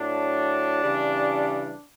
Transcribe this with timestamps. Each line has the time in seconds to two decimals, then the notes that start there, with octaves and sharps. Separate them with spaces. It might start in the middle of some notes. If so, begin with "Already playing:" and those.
Already playing: A2 F#3 D4
0.83 C#3 E3 G3